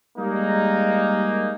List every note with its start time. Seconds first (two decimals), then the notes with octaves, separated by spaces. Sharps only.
0.18 G3 G#3 A#3 D#4